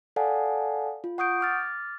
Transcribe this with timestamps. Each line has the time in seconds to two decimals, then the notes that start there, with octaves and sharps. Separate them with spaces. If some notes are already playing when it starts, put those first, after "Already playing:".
0.16 A4 D5 F5 F#5 G#5 A5
1.04 F4
1.18 F#5 C#6 D#6 G6 D7
1.41 D6 F6 A6